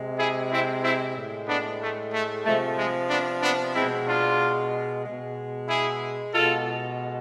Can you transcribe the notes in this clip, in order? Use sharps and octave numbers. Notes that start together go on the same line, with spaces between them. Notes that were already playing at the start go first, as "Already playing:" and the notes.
Already playing: C3 G#3
E4 G#4
C4 E4
C4 E4
A2 G#3
B3 D4
A3
A3
C3 F3 G#3 A3
G#3
B3 D4
B3 D4
B2 G#3 C4 E4
D4 F4
B2 G#3
E4 G#4
B2 G#3 F4 A4